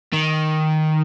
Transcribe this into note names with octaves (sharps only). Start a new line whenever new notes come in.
D#3